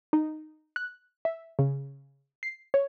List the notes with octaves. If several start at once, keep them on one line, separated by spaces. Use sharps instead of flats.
D#4
F#6
E5
C#3
C7
C#5